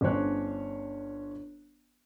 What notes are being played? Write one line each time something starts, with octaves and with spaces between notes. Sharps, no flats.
G1 C#4 D4 C5 C#5 F#6